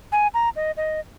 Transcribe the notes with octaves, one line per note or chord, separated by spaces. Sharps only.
G#5
A#5
D#5
D#5